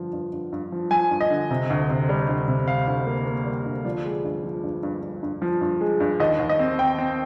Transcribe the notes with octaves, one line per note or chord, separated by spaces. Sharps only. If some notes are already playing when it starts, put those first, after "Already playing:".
Already playing: G2 D3 F3
G2
G2
G2
F3
F3 G#5
G2
D#5
D3
C3
D2
C3
G3
D2
C3
C3 F5
D2
A#3
A#3
G3
D2
F3 D5
G#3
G2
F3
G2
G2
G2
G2
F3
G2
G#3
G2
D#2 D#5
D#2
D#5
C4
C4 G5
C4